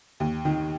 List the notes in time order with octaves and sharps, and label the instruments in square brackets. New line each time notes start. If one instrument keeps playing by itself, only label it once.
[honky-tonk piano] D#2
D#3